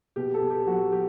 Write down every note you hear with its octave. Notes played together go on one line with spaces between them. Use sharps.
B2 G4
A4
B2
G4
F#3 F#4
F#3 G4